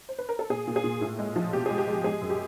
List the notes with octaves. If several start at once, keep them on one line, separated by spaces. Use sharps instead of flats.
C5
B4
A#4
A4
A#2 G#4
A#2
G#4
A#2
A2
G#3
F3
B2 G4
G#3 G#4
G4
G#3
G#3 G#4
F#2
G4